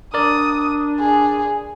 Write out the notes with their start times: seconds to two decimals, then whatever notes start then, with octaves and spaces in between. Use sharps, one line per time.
0.14 D4 A#4 D5 D#6
1.00 G#4